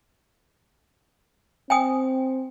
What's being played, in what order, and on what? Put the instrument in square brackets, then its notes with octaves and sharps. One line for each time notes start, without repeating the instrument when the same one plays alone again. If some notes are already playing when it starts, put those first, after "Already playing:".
[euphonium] C4 [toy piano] G5 G#5 D#6